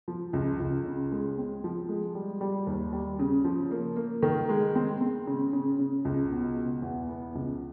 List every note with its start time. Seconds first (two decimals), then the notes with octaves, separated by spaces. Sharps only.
0.08 F3
0.33 C#2
0.60 C#2
0.85 C#3
1.12 G#3
1.38 C4
1.64 F3
1.89 G#3
2.15 G3
2.41 G3
2.67 D#2
2.93 G3
3.19 C#3
3.44 F3
3.71 A#3
3.96 A#3
4.23 D#3
4.49 G#3
4.75 C4
5.01 C4
5.27 C#3
5.53 C#3
5.79 C#3
6.05 C#2
6.31 B2
6.57 B2
6.82 E2
7.08 B3
7.35 C#2